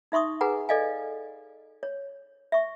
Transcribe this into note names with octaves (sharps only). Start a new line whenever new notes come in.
D#4 E5 C6 C#6 D#6
G#4 B4 F#5 G#5 A#5
A4 D5 D#5 F5 G#5
C#5
E5 C#6